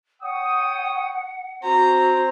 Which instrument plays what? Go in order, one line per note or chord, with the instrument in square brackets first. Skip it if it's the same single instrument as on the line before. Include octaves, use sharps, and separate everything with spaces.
[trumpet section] C#5 G5 D#6 [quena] F#5
[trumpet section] C4 C5 [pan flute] F#4 [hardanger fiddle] A#5